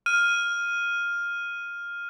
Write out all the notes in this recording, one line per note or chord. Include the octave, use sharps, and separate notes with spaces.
F6 D#7